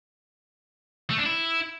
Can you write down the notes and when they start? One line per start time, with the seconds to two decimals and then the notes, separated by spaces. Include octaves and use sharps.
1.10 A3
1.18 D4
1.26 E4